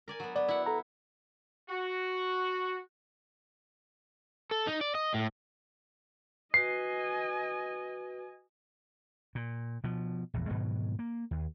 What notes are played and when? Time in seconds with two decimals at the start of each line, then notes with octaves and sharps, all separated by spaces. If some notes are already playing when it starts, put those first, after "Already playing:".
0.08 A#4 D5 G#5
0.20 F#3 B3
0.36 B3 D5
0.48 E4 F#5
0.66 A4 A#5
1.70 F#4
4.51 A4
4.67 D#4
4.81 D5
4.95 D#5
5.14 A2
6.54 F#4 B4 D#5 G#5 C7
9.35 A#2
9.84 B2 F3
10.34 A#1 E2
10.49 G#2 B2 D#3 F#3
10.99 A#3
11.31 D#2